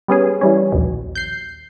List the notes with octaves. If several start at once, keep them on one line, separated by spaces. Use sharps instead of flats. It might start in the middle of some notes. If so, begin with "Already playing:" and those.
G3 B3 C#4 G#4
E3 G3 C#4
A#1 D#2 B2
G6 C7